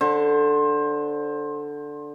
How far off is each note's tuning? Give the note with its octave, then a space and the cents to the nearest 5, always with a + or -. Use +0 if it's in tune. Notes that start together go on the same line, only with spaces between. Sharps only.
D3 +0 C5 +25